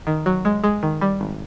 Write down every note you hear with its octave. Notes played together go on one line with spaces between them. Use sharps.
D#3
F#3
G#3
G#3
D#3
G3
G#1